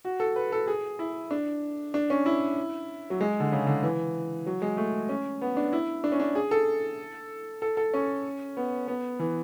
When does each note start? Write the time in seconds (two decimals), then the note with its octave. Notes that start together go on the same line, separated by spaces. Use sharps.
0.05 F#4
0.20 A4
0.36 B4
0.52 A4
0.67 G#4
0.99 E4
1.31 D4
1.94 D4
2.10 C#4
2.26 E4
3.10 F#3
3.21 G#3
3.40 D3
3.52 C#3
3.67 D3
3.83 E3
4.46 F#3
4.62 G#3
4.77 A3
5.09 C#4
5.42 B3
5.57 D4
5.73 E4
6.04 D4
6.12 C#4
6.20 D4
6.35 G#4
6.51 A4
7.62 A4
7.77 A4
7.94 C#4
8.57 B3
8.88 B3
9.19 E3